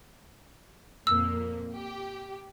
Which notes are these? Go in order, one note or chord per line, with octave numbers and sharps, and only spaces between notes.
F2 A#2 A#3 E6
G4